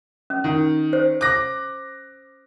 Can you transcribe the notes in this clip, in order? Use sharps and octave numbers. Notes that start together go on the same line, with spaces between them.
C#4
D#3
C5
D6 F#6 A#6